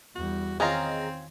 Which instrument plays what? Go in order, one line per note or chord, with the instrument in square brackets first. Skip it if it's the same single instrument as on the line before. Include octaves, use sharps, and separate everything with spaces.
[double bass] E2 G3 [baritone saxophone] F#4
[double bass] D#3 [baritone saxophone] C4 [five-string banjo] C#4 F4 [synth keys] G#4 D#5 A#5